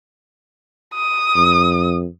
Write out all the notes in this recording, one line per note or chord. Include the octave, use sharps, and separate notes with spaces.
D#6
F2